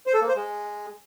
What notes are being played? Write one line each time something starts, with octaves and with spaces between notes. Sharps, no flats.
C5
A4
A#3
C5
G#3